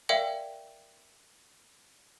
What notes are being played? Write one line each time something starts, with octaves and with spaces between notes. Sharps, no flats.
A#4 D5 E5 F5 G5